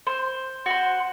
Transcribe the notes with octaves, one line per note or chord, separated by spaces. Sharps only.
C5
F#4 C5